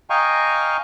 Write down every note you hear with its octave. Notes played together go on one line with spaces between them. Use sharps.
D#5 F5 G5 G#5 A#5 C#6